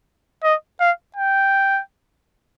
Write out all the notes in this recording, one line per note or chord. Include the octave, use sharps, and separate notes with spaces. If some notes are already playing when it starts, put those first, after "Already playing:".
D#5
F5
G5